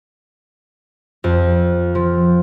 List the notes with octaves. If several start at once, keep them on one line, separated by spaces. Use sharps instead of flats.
F2
F3